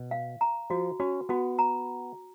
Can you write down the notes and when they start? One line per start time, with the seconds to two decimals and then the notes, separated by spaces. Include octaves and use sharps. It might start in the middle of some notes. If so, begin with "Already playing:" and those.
Already playing: B2
0.11 F5
0.41 A#5
0.70 F3 F#4
1.00 C#4 F#4
1.29 B3 F#4
1.59 A#5